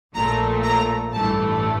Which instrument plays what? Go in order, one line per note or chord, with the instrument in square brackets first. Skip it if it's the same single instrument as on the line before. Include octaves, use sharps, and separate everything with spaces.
[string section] A#1 A#2 A3 A#5
A#5
A1 G2 E3 A3 A5